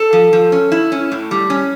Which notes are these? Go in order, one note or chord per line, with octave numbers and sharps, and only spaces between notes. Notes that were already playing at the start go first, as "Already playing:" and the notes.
Already playing: A4
F3
F3
C#4
E4
C#4
A2
G3
C#4